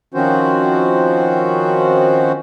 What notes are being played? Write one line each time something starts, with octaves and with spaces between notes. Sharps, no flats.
D#3 F3 C4 C#4 F#4 C5